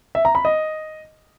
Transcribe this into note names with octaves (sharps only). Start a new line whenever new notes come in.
E5
A#5
B5
D#5